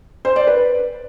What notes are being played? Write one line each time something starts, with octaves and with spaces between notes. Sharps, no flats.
C5
D5
B4